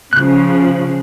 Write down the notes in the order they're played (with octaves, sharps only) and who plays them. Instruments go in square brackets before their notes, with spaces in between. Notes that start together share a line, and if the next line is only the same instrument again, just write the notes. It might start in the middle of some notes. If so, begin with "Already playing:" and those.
[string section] C#3 F3 [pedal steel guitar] F#6